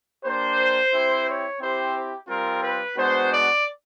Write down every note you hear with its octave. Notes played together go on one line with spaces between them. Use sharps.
A#3 D4 G4 C5
C4 E4 G4
C#5
C4 E4 G4 C5
G3 C4 F4 A#4
B4
G#3 B3 D4 F#4 C5
D5